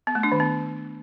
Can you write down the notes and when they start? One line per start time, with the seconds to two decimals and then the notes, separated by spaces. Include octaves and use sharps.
0.07 B3
0.15 A3
0.23 D4
0.32 D#3
0.40 B3